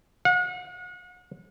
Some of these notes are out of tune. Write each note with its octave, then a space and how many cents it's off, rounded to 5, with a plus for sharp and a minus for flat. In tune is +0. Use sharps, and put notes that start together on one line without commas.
F#5 -40